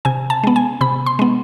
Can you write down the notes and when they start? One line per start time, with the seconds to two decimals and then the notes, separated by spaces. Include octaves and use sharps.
0.05 C3 G#5
0.30 A5
0.44 G#3 B3
0.56 G#5
0.81 C3 B5
1.06 C6
1.19 G#3 B3